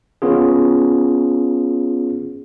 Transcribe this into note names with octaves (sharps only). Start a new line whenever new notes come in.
B3 C#4 F4 G#4